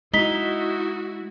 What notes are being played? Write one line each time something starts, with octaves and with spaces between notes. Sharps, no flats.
G#3 D#4 E4 F#4 B6 G7